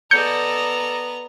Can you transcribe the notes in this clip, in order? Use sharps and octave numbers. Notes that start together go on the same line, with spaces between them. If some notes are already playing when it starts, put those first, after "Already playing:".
B3 A4 D5 D#5 A#5 G6 C#7